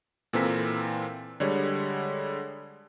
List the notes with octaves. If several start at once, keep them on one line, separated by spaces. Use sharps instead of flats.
A#2 E3 C4 A4 A#4 B6
D3 G3 G#3 C#5